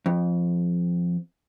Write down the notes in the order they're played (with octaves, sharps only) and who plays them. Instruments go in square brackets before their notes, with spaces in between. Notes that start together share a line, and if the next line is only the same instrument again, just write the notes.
[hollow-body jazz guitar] F2